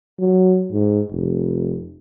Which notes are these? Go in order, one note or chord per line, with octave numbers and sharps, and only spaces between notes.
F#3
G#2
F1